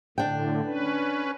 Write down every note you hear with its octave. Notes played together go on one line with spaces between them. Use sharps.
A2 D3 D4 G5
C#4 B4